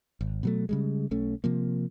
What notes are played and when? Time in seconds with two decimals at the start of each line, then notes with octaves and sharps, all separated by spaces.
0.21 G#1
0.43 B2 F#3 A3
0.69 C#3 G3 G#3
1.11 B1 A3 C#4
1.44 C3 F3 A#3